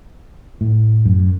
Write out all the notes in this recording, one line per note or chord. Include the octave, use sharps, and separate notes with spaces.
A2
F#2